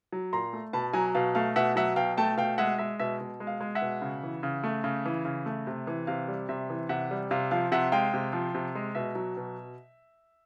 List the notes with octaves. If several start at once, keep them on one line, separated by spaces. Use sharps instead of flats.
F#3
A#2 A#5 C6
A3
B2 A5 B5
F#3 G#5 A#5
B2 F5
A3 F5
B2 E5 F#5
F#3 E5 F#5
B2 F5 G5
A3 G5 A5
B2 F5 G5
G#3 E5 F#5
G#3 E5
B2 E5
B2
G#3
F5
G#3
E5 F#5
B2
C#3
E3
C#3
A3
C#3
E3
C#3
A3
C3
E3
C3 F5
G3
C3 E5
E3
C3 E5 F#5
G3
C3 F5
F3 F5
C3 E5 F#5
G#3 F5 G5
C3
F3
C3
G#3
B2 E5
F#3
B2